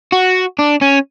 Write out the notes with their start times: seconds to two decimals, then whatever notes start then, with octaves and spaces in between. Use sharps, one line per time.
0.13 F#4
0.59 D4
0.81 C#4